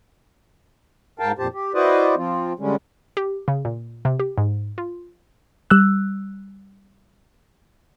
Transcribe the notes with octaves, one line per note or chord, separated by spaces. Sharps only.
G#2 A#4 F5 G5 A5
F2 A#2 G4 C5 A5
G4
E4 F#4 B4 C5 D5 D#5
F3 C4 F4
D3 G3 G#3 C#4
G4
C#3
A#2
C3
G4
G#2
F4
G3 E6 F#6